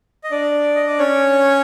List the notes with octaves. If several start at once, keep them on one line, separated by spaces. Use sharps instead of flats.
D#5
D4 D5
D#5
D5
C#4 C#5